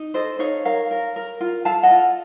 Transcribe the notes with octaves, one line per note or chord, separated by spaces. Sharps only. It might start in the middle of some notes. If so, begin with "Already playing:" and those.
Already playing: D#4
A4 C5 D#5
D#4 C#5 F5
A#4 C#5 F5
A#4
A#4
F4
A4 F5 A5
D#5 F#5
F4